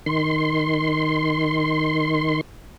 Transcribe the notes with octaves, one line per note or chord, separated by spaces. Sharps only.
D#3 C6